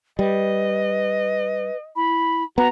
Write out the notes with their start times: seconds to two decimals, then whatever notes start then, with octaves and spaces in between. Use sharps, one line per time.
0.19 G3 B4 D#5
1.96 E4 B5
2.58 B3 F#4 A#5